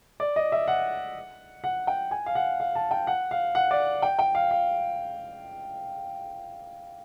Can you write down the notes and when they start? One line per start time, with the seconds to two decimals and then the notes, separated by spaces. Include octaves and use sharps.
0.20 D5
0.36 D#5
0.52 E5
0.68 F#5
1.64 F#5
1.87 G5
2.11 G#5
2.26 F5
2.35 F#5
2.60 F5
2.75 A5
2.91 G5
3.07 F#5
3.31 F5
3.55 F#5
3.71 D5
4.02 G5
4.19 G5
4.35 F5
4.51 F5